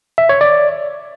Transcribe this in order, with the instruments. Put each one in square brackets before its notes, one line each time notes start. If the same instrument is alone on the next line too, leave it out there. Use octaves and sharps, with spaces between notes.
[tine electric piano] E5
C#5
D5